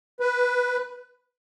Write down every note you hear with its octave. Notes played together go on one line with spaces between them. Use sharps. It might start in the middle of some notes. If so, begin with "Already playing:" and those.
B4